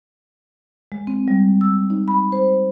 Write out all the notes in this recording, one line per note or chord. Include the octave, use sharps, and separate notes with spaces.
G#3
C4
G3
E6
D#4
B5
C5